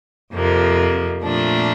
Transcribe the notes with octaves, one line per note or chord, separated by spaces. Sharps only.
F2 C3 F3 A#3
A#2 F3 A3 D4